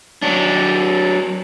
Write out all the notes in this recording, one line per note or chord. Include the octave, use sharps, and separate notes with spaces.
F#3 D4